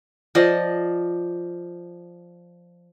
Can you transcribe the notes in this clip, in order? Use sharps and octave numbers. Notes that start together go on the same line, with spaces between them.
F3 D5 D#5